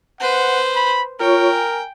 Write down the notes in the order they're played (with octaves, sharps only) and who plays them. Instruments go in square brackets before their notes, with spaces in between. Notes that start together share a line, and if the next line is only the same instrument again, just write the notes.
[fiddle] B4 C5 [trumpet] F#5
[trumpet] B5
[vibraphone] F4 C#5 C#6 [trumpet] A#4 [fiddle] G5
[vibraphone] G#5